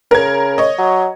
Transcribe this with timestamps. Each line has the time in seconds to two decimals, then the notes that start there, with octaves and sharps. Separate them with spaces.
0.11 C#3 A#4 G#6
0.58 C#5 D#5
0.78 F#3